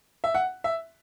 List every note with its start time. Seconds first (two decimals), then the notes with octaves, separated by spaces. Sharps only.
0.24 E5
0.35 F#5
0.64 E5